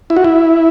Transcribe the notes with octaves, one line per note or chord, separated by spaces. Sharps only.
E4
F#4
E4